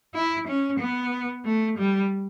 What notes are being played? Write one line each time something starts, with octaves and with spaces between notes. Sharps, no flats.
E4
C#4
B3
A3
G3